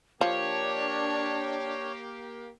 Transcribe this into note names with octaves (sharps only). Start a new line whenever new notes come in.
F3 A#3 D4 G4 C#5